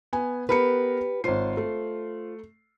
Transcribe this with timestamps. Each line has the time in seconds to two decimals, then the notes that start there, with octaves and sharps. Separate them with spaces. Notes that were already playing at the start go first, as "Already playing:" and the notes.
0.13 B3 G#5
0.49 B3 G4 A#4 B4 C#7
1.24 G#1 F4 C5 C#5 C7
1.57 A3